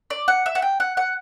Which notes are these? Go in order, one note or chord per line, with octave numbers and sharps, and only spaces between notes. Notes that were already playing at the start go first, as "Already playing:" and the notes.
D5
F#5
E5
F#5
G5
F#5
F#5